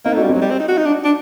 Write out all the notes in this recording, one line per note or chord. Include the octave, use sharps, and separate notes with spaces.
A#3 C4 D#4
A3
D4 F#4
G3
F#3 C4 D#4
G3
C4
D#4
F#4
D#4
D4
D4